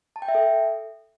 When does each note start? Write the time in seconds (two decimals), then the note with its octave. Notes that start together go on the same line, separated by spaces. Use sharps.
0.16 A5
0.22 G5
0.28 E5
0.35 A4